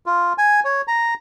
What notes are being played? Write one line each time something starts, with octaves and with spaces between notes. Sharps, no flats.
F4
G#5
C#5
A#5